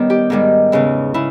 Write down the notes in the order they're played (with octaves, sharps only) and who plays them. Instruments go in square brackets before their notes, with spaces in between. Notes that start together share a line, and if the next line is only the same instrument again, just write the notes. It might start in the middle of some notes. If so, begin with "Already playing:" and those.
Already playing: [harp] D#3 G3 B3 C#4
G4
G#2 D#3 G3
E2 C#3 E3
C#3 E4